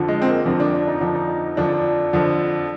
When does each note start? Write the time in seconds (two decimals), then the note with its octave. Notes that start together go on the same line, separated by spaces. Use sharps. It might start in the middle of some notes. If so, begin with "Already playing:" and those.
Already playing: F2 D3 F3
0.08 G#3
0.22 C4
0.27 A#3
0.45 F2 D3 F3 C4
0.60 D4
0.74 D4
0.87 D#4
1.01 F2 D3 F3 D4
1.15 D#4
1.57 F2 D3 F3 D4
2.13 F2 D3 F3